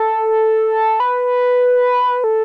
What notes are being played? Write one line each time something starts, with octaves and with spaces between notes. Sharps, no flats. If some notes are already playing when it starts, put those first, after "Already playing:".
Already playing: A4
B4
A4